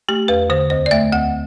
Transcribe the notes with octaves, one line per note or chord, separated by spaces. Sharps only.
A3 G4
E2 B4
D3 C5
D2 C5
D5
A3 E5
D2 F#5